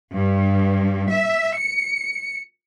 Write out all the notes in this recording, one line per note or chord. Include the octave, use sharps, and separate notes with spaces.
G2
E5
C#7